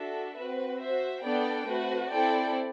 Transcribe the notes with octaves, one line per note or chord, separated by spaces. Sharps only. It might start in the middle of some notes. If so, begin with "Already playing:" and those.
Already playing: D4 F#4 A4 E5
C4 F#4 B4
F#4 C5 E5
B3 D4 A4 D5 G5
A3 C4 F#4 B4
C4 E4 A4 D5 G5